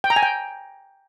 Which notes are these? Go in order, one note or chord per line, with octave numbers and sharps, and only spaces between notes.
G5
A#5
G#5
G5